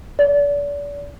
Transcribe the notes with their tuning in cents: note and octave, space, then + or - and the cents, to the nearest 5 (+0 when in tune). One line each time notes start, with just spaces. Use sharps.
D5 -35